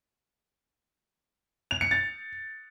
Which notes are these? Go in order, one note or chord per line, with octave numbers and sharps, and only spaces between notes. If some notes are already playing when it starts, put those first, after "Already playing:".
F7
C#7
A6